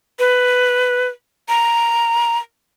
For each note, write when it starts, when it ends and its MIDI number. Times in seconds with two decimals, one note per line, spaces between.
0.19 1.08 71
1.49 2.38 82